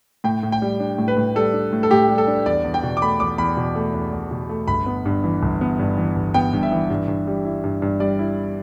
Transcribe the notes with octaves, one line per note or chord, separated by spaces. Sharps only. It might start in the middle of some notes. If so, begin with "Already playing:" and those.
A2 G5
A2
G5
G3
D4
A2
B4
A2
G3 A4
D4
A2
A4
A2 G4
G3
A4
D4
E2 D5
E2
G5
B2
D6
A3 B5
E2 D6
E2 B5
B2
A3
E2
E2
B2
A3
G1 B5
B3
G2
E3
G1
B3
G2
E3
G1
B3 G5
G2
E5
E3
G2
G2
G3
E4
G2
G2
G3 D5
E4